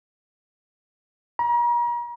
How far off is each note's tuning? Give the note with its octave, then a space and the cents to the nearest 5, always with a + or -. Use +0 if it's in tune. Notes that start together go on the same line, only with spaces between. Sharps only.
A#5 +40